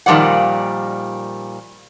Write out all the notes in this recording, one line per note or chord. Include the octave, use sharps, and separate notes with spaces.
A#2 D#3 F3 G3 D5 F#5